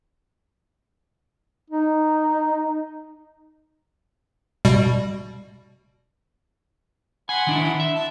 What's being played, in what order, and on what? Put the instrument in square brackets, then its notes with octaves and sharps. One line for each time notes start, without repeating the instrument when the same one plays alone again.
[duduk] D#4
[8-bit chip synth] B2 G3
[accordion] F#5 B5 C6 [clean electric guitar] G#5
[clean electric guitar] D#3 D4 E4
E5
[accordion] A5